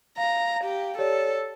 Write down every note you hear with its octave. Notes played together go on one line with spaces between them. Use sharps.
F5 A#5
G4
G4 A4 C#5 D5